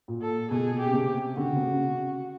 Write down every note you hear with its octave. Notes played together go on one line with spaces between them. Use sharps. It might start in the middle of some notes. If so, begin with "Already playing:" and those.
A#2
A4
B2 G#4
G4
C#3
C3
D3 F#4
C#3
C3
C#3